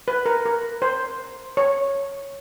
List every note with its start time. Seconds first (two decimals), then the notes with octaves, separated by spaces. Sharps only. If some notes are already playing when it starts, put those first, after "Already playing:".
0.08 B4
0.26 A#4
0.45 A#4
0.82 C5
1.57 C#5